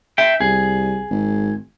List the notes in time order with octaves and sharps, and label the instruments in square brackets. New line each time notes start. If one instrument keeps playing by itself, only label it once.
[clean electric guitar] E5 G5
[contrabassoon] C2 [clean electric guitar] G#4
[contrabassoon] G#1